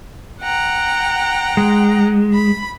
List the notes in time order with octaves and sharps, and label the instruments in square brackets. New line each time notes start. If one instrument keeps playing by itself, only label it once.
[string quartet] F#5 G5 A#5
[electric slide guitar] G#3
[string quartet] B5